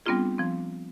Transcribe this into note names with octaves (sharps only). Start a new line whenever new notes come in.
G3 B3 C4 D4 F4 G#4
F3 C4